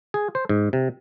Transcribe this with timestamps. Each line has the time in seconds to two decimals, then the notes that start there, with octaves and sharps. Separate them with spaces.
0.14 G#4
0.35 C5
0.49 G#2
0.73 C3